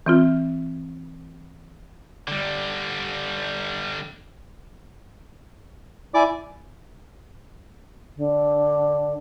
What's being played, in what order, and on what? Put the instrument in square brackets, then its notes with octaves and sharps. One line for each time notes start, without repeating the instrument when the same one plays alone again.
[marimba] E3 C4 F4
[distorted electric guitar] D3 G3
[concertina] E4 D5 D6 [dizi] G#5
[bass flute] D3